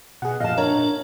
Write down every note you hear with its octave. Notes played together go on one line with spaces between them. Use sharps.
B2 G#4 F#5
A#2 D#5 F5 A5
D4 A#4 C#5